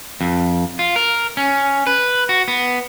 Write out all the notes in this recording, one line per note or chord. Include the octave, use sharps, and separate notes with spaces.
F2
F4
A#4
C#4
B4
F#4
B3